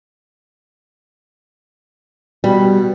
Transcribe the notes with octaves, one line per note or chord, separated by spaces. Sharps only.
B2 G3